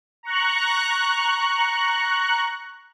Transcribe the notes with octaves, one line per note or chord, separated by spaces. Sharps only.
A#5 C#6 F#6